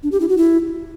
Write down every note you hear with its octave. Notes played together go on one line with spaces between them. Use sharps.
D4
G4
E4
F#4
E4